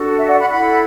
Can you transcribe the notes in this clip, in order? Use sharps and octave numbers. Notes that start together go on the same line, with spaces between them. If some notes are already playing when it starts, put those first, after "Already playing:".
Already playing: D4 F#4 A4
E5
D5 F#5
F#5 B5
E4 A4 F#5 B5